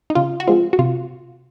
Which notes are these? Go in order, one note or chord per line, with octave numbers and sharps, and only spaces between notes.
D#4
C#3 F4
F#4
F3 G#3 C4 F4
F#4
C3 F4